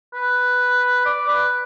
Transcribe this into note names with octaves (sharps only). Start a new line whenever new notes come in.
B4
D5
B4